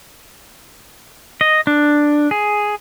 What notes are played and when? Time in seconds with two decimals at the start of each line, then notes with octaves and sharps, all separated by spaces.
1.41 D#5
1.67 D4
2.31 G#4